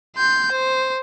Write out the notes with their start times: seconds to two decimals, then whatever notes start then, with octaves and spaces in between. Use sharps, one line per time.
0.17 C6 G6
0.51 C5